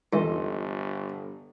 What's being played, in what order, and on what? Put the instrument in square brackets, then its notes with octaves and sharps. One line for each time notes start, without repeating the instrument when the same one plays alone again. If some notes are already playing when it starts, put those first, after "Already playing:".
[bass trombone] G1 [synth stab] E2 E3 [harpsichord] G#2 [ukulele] F4 A4 D#5